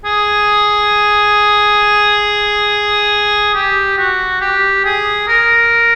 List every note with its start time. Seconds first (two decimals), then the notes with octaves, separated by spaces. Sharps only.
0.05 G#4
3.55 G4
3.98 F#4
4.41 G4
4.85 G#4
5.28 A#4